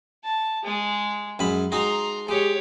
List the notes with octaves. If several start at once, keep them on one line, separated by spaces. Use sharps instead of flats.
A5
G#3 G#4
F#2 G#3 B5
G#3 D#4 F#4 A#5 C6
G#3 G4 C#5